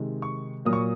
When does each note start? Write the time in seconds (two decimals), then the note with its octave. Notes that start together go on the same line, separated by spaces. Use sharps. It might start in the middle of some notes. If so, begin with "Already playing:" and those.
Already playing: C3 D#3 G#3
0.22 C#6
0.65 A#2 F#3 A#3 D#6
0.73 C#6